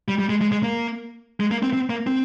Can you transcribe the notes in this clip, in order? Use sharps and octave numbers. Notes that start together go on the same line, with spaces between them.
G3
G3
G#3
G#3
G#3
A#3
G#3
A#3
C4
C4
A#3
C4